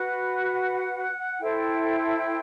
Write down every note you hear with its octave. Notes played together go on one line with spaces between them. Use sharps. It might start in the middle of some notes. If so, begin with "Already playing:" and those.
Already playing: F#4 B4 F#5
E4 A4 C5 G5